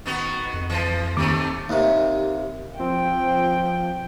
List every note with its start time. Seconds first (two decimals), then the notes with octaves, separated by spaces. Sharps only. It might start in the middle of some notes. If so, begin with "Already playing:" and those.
0.06 D#3 B3 F#4
0.54 F2
0.70 E3 F3
1.17 D#2 C3 D#3 A3 D6
1.69 D#2 C3
2.80 F3 C4 G5